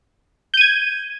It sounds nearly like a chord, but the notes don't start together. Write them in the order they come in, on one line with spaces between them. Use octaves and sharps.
G6 D#7 G#6